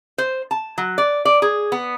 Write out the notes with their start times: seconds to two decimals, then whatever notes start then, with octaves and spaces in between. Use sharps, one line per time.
0.18 C5
0.51 A5
0.78 F#3
0.98 D5
1.25 D5
1.42 G#4
1.72 B3